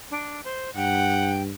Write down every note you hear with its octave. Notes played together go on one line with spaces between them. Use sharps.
D4
C5
G2 F#5 G5